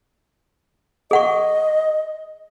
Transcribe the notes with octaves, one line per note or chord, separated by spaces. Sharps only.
G#4 D#5 F#5 C#6